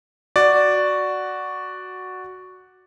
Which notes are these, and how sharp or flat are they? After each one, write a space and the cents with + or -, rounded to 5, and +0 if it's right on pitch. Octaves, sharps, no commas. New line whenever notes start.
F#4 +0 D5 +0